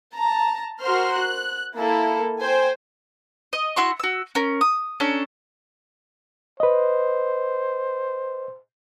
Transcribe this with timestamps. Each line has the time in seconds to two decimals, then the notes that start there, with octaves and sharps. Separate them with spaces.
0.15 A5 A#5
0.81 F#4 A#4 C5 C6 F6
1.15 F#6
1.76 A#3 E4 A4
2.41 C5 G5 G#5
3.53 D#5
3.76 E4 F#4 C6 C#6
4.00 F#4 E6
4.35 C#4 A#4
4.61 D#6
5.00 C#4 D4 A4 A#5
6.60 B4 C5 D#5